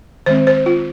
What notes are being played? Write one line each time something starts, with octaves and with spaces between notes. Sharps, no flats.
D#3 G#3 C4 C5
C5
F4